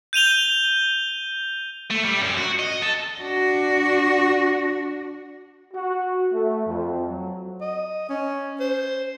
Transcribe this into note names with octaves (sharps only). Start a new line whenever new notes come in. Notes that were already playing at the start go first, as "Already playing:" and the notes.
G6 D#7 F7 G7
A3
G3
F#2
F#4
D#5
A4
D4 F#4
F#4
A3
F2
F#3
D#5
C#4
C5